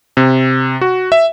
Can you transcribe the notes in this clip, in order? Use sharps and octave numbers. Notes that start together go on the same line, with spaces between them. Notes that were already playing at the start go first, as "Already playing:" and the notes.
C3
F#4
E5